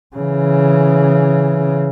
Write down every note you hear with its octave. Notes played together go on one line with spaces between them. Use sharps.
C#3 E3